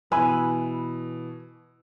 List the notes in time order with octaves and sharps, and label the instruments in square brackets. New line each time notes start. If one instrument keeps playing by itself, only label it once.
[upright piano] B2 E3 E6 [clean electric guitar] B4 [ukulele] G#5